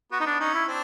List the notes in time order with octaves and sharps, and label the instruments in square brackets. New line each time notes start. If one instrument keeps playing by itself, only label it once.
[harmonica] B3 [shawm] F#4
[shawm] D#4
D4
[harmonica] C#4 [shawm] D#4
[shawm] E4
[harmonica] C4 D4